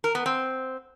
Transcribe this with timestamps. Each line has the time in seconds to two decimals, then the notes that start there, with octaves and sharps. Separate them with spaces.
0.04 A#4
0.15 B3
0.26 C4